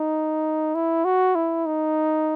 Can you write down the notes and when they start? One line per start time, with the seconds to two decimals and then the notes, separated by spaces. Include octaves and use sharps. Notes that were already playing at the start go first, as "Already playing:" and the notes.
Already playing: D#4
0.75 E4
1.05 F#4
1.35 E4
1.66 D#4